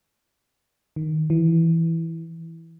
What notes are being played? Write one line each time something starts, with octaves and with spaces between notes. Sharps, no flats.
D#3
E3